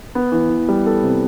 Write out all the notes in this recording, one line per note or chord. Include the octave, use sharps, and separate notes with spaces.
B3
E3
E3
G3
B3 A4
C3